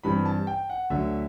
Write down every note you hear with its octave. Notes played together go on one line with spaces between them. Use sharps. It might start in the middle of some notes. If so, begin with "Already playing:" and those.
G2 E3 G3 C4 B5
A5
G5
F#5
D2 D3 F#3 E5